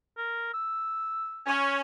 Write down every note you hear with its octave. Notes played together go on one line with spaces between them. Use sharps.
A#4
E6
C#4